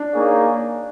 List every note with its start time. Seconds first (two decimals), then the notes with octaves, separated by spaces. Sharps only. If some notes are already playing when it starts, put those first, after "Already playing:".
Already playing: D4
0.14 A#3 D#4 G#4 C#5 F5